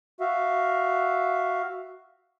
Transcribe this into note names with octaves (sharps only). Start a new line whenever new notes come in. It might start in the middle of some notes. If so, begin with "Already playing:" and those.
F#4 E5 F5